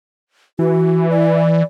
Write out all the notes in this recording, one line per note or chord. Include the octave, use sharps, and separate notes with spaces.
E3 F#4
D5